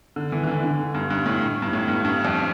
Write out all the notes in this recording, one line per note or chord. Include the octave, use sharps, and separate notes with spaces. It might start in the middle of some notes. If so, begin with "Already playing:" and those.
D3
E3
E3
D3
D3
G2
G2
A2
G2
A2
G2
G2
F2